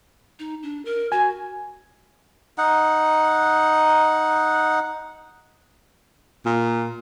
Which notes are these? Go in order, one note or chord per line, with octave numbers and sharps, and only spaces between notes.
D#4
D4
A#4
F#4 G#5
D#4 F#5
A#2